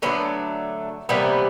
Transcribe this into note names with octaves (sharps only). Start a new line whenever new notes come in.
D3 F#3 A3 B3 C#4
C3 E3 G3 A#3 B3